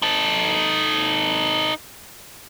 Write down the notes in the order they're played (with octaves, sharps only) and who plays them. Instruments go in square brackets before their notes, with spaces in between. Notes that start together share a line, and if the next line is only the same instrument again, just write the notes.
[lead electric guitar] D#4 A4